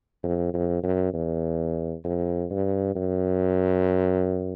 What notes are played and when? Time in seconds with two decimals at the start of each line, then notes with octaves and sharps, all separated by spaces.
0.23 F2
0.54 F2
0.83 F#2
1.14 E2
2.04 F2
2.50 G2
2.95 F#2